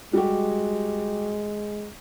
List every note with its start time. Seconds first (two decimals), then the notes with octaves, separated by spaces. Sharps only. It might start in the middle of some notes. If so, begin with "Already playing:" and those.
0.13 G3 G#3 F#4 G4